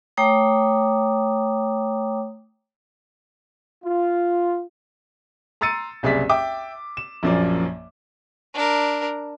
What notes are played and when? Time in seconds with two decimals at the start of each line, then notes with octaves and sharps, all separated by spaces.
0.17 A3 C#5 G5 A#5 D6 D#6
3.83 F4
5.61 A#5 C6 E6 A6 C#7 D#7
6.03 F#1 C2 G#4 D5 E5 B6
6.29 E5 G5 D6
6.97 E7
7.23 A#1 F#2 F3 A#3 D5
8.54 D4 A#4